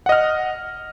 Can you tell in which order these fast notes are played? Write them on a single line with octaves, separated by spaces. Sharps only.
F#5 D#5 F6